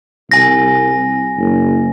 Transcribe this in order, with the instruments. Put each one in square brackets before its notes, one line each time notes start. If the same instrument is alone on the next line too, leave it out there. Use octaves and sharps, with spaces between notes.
[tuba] C2 [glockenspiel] G#5 A#6
[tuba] F#1